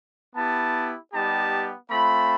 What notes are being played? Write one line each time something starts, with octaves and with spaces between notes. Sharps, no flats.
B3 E4 G4 A5
G3 B3 D#4 G4 A5
A3 C4 F4 B5